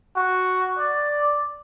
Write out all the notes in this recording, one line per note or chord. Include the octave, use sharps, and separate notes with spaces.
F#4
D5